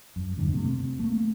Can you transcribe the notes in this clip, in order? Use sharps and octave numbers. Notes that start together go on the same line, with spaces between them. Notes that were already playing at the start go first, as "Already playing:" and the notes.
F#2
E2 G2 D3 E3
C3 A3
C4
A3 A#3